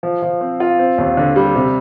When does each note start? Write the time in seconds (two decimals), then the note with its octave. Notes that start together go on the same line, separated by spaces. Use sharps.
0.03 F3
0.22 F3
0.41 C4
0.60 F4
0.79 C4
0.98 D#2
1.17 D3
1.36 G3
1.55 C3